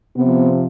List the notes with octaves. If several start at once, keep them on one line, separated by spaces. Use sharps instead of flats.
C3 F3 B3